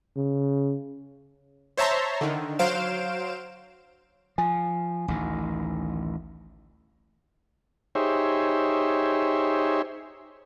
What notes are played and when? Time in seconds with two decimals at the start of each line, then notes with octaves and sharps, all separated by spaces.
0.17 C#3
1.77 C5 C#5 E5 A5 A#5 C6
2.21 D3 D#3
2.59 F#3 C5 F5 D7 E7
4.38 F3 G#5
5.08 A1 D2 D#3
7.95 D#4 G4 G#4 C5 C#5 E5